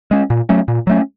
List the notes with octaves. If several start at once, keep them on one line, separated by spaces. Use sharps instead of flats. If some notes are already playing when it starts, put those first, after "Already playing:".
G#3 C#4
A#2
F#3 A3 C#4
A#2
F#3 A3 C#4